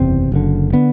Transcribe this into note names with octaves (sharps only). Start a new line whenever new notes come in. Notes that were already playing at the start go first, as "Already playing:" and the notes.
Already playing: F#1 E2 C3 C4
F#1 F#2 D3
D3 B3